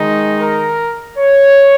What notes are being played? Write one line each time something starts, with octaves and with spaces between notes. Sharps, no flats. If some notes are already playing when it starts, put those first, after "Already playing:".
Already playing: D#3 G#3 D#4
A#4
C#5